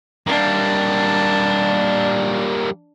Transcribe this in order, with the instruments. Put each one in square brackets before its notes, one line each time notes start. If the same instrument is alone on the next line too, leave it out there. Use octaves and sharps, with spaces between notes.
[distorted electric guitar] G3 A#3 [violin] D4